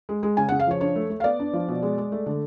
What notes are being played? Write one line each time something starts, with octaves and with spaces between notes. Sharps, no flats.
G#3
G#3
C#3 G#5
F#5
C#3
F5
F3 C#5
D4 C#5
A3
A3
F5
B3 D5
D4
F3
B2
G#3
G#3
A3
D3